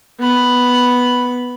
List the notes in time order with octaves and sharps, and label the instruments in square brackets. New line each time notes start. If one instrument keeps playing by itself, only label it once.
[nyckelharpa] B3 B5